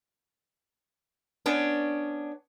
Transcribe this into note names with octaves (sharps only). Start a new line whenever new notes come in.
B3 C#4 D4